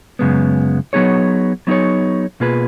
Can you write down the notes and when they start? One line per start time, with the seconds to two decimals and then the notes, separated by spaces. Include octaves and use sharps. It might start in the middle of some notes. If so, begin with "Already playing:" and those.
0.19 F#2 C#3 G#3 B3
0.93 F#3 B3 D#4 G#4 C#5
1.67 F#3 B3 D#4 G#4 C#5
2.40 B2 A#3 F4 G#4 B4